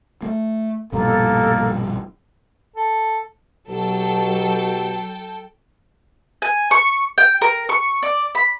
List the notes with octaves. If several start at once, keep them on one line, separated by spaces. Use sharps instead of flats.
A3 A#3
A#1 G2 B2 A#3 A4
A4
B1 B2 F#3 G4 A4 G5
G#5
C#6
G5
A#4
C#6
D5
B5